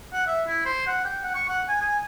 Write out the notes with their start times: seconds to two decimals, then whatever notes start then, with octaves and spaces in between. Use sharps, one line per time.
0.13 F#5
0.27 E5
0.47 E4
0.65 C5
0.87 F#5
1.05 G5
1.23 F#5
1.35 C#6
1.49 F#5
1.68 G#5
1.81 G#5